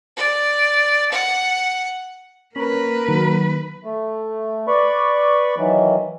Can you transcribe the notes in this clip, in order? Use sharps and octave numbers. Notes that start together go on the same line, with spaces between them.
D5
F#5
A#3 C#4 A#4 B4
D#3 F#3
A3
B4 D5 B5 C#6
D#3 E3 F#3